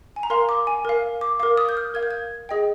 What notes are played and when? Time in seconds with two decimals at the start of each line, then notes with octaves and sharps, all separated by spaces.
0.16 G#5
0.23 A#5
0.30 A#4 F5 C6
0.49 D6
0.67 G#5
0.85 A#4 F5
1.21 D6
1.40 A#4 F5 D6
1.57 D#6
1.69 G6
1.77 F6
1.94 A#4 F5 G#6
2.03 G6
2.11 G#6
2.49 G#4 D#5 G5